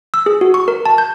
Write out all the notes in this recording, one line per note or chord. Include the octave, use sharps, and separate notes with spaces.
E6
G#4
F#4
C#6
A#4
A5
G6